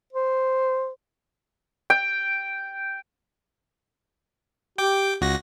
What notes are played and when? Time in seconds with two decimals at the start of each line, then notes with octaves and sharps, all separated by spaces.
0.13 C5
1.90 G5
4.78 G4 G5 D6
5.21 C#2 F#4 A#6